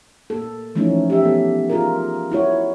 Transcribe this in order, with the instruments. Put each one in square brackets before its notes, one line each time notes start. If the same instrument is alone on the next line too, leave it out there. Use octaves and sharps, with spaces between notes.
[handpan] A#3 A4
E3 F3 A3 C#4 D#4
G4 E5
B3 A4
F4 G#4 A#4
E4 F#4 C#5